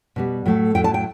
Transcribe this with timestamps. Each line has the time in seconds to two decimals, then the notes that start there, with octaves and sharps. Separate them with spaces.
0.16 B2 G3 B3
0.46 A2 F#3 A3
0.75 A2 F#3 A3 G5
0.84 A5
0.94 G5